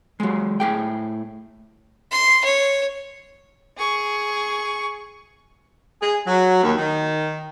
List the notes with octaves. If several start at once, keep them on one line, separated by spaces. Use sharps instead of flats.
F#3 G#3
A2 G#4 G5
C6
C#5
G#4 C#6
G#4
F#3
D#2
D#3